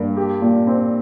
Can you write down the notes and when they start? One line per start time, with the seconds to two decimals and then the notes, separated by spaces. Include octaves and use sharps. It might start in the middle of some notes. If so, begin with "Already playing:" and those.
Already playing: G2 A#3
0.17 G4
0.42 A#2
0.67 C4